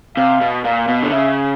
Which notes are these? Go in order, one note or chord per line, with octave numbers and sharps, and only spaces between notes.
C3 F5
B2
A#2 F5
B2
D3
C#3 E5